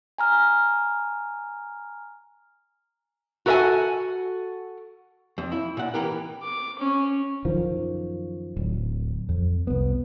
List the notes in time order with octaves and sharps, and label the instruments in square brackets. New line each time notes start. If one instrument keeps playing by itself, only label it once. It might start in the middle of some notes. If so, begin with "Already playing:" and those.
[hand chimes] G#5 A#5 F6
[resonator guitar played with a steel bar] F#4 A4 A#4 E5 F#5 G#5
[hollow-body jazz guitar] F2
E4
A#2 F#5
E3 G4 A#4
[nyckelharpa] D6
C#4
[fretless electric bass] F#2 D#3 F3
D1
F2
C2 B3